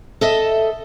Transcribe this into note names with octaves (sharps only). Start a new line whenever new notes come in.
A4 D#5 E5